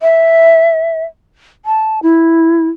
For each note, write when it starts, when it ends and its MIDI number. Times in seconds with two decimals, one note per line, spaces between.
0.01 1.04 76
1.65 1.99 81
2.03 2.68 64